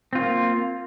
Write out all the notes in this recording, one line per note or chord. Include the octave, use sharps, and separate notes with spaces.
A#3 C4 F4